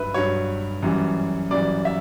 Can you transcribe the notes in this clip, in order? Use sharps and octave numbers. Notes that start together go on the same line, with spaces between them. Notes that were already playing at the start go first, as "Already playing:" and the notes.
Already playing: G2 F#3 B4 E5
G2 F#3 C#5
F#2 E3 G3
F#2 E3 G3 D5
E5